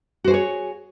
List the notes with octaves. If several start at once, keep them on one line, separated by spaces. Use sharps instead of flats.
F#4 G#4 C5 C#5